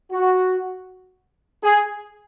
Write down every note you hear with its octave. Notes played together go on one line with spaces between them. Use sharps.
F#4
G#4